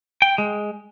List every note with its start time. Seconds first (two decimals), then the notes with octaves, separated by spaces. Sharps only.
0.22 G5
0.38 G#3